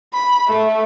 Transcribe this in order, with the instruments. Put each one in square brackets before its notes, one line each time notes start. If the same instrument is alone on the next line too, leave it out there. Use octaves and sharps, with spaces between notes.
[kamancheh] B5
A3